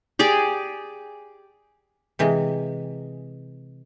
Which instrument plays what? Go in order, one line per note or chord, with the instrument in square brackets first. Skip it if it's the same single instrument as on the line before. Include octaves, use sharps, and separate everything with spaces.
[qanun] G4 G#4 D5
[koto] C3 E3 G#3